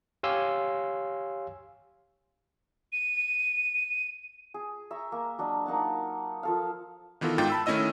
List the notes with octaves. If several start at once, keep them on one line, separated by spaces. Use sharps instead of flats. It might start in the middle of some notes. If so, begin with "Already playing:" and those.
G4 C#5 F5 G#5 C6 E6
D#7
G#4
E5 A#5 C#6
A#3
F#3 D4 D#5
A#3 D#4 F#5 A5
F3 A4 F5
D#3 E3 B3 F4 A4 A#4
G#2 D#4 F4 G5 A6
A5 B5 E6
D#3 A3 C#4 E4 D#5 E6